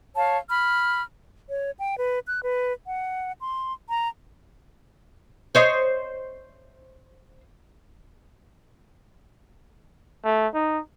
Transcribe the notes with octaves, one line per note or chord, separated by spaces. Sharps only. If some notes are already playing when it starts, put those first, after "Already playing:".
C#5 F5 A5
B5 F6
C#5
G5
B4
F#6
B4
F#5
C6
A#5
C5 C#5 D#5
A3
D#4